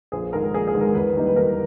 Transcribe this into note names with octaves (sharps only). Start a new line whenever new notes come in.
A#1 G#4
G#2 D#3 G#3 A#4
A#1 G#4
G#4
G#2 D#3 G#3
A#4
E2 B4
D#3 G3 A#3 D#4
B4
E2 A#4